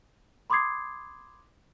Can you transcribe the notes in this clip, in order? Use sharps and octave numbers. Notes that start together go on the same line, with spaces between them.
B5 C6 D6 D#6 G#6 C7